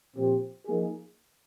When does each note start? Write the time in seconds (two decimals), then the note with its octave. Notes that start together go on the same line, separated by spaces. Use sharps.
0.16 A#2 F3 C4 G4 C5
0.66 F3 A#3 D#4 G#4